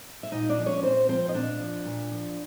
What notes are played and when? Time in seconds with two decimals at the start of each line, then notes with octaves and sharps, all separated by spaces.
0.23 E5
0.32 A#2 D#4 D#5
0.49 D4 D5
0.58 F3
0.66 C#4 C#5
0.83 A#2 C4 C5
1.09 F3 C4 C5
1.29 D#5
1.34 A#2 D4 D5
1.60 F3
1.85 A#2
2.12 F3